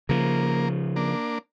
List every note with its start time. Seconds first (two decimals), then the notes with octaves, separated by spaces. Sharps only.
0.09 C#3 F3 A#3
0.96 A#3 D4